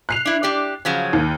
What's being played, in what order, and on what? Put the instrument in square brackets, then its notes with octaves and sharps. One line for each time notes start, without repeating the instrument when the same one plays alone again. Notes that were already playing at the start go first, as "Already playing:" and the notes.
[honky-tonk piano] F#6 C7 F7
[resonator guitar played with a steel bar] D4 E4
D4 G4 D5
C#3 F3 F#3
[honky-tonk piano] D#2